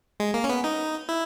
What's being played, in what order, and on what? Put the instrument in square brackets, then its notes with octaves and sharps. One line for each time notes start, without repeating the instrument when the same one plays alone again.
[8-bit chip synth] G#3
A#3
C#4
B3
D#4
E4